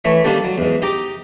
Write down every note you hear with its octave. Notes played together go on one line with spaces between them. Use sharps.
E3 A3 C#5 E5
D#3 G3 A#3 D4 G4 A4
F#3
E2 G#2
D#4 G4 A#5 D6